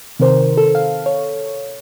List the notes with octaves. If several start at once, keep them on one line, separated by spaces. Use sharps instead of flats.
C3 D#3 A#4 C5
A4
F5
C#5